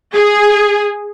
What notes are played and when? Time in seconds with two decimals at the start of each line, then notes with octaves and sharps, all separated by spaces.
0.13 G#4